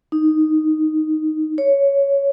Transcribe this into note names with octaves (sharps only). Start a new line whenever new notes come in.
D#4
C#5